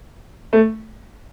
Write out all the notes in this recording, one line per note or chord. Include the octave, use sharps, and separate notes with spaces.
A3